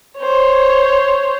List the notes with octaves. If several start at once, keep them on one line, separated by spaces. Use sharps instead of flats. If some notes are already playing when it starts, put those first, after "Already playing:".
C5 C#5